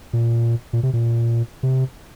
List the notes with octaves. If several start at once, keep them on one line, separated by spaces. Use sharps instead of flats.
A#2
A#2
C3
A#2
C3